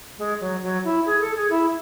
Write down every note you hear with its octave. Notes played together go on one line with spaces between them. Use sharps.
G#3
F#3
F#3
E4
G#4
A4
G#4
E4